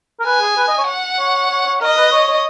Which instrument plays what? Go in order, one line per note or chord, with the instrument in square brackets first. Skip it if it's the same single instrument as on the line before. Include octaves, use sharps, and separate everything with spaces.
[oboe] A#4
[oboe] B4 [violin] G#5
[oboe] G#4
B4
D#5
C#5
[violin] F#5
[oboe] C#5
C#5
C#5
[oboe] A#4 [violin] D#5
[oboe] B4
C#5
C#5